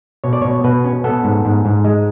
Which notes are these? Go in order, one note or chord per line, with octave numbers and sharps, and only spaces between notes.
B2 C#5
D5
B2 C#5
B2 B4
C#4
B3 A4
G#2
G#2
G#2
G#3